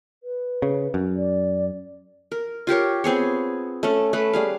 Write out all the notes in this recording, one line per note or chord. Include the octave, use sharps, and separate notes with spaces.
B4
C#3
F#2
D5
A#4
F4 G4 A#4 C#5
B3 C4 G#4 C#5
A3 C#4
A3 B4
G3 G#4 F5